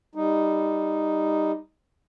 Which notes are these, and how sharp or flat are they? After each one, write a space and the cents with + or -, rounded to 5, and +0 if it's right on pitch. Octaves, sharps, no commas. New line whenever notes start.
G3 +10 D#4 +0